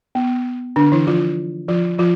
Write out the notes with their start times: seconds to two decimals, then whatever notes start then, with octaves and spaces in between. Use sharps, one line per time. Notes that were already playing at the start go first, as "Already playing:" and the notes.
0.15 B3
0.76 D3 D4
0.92 E3 E4
1.07 F3 F4
1.68 F3 F4
1.99 F3 F4